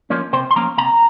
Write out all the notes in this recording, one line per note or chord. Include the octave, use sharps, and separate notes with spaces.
F3 A#3 C#4
C3 C5
C6
F3 A#3 C#4 A#5
C3 A#5